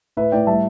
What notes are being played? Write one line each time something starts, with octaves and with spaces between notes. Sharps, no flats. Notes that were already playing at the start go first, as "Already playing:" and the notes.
A2 B4 E5
A2 D5 G5
G3 E5 A5